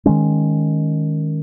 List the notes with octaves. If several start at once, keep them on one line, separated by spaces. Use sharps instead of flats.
D#3 G#3 C#4